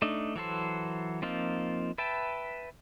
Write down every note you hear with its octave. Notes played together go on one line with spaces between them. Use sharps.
A3 D4 D#4
E3 F#3 A4 C5
F3 A#3 C4 D#4 F4
B4 E5 G5 A5